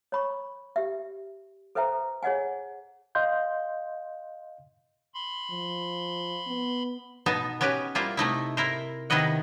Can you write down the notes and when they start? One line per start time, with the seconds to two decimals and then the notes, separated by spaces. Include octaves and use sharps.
0.12 C#5 B5 C#6
0.76 G4 E5
1.75 A4 B4 C5 E5 G5 A#5
2.23 G#4 C#5 D#5 F#5 G#5
3.15 D#5 F5 C6 G6
5.14 B5 C6
5.51 F3
6.47 B3
7.26 B2 B3 D#4 A5
7.61 B3 C#4 F#4 G4 B4
7.95 G3 A#3 E4 F4 C5
8.17 C3 A3 D#4 E4
8.57 E4 A#4 C5
9.10 C3 D#3 B3 E4 D#5 F#5